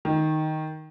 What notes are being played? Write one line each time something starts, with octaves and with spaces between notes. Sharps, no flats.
D#3